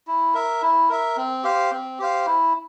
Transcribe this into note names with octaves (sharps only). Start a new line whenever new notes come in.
E4
A#4 E5
E4
A#4 E5
C4
G4 C5 F5
C4
G4 C5 F5
E4